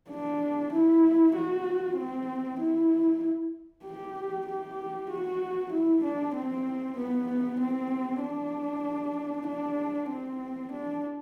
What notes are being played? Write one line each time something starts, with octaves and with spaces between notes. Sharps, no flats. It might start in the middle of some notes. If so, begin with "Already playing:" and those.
D4
E4
F#4
C4
E4
G4
G4
F#4
E4
D4
C4
B3
C4
D4
D4
C4
D4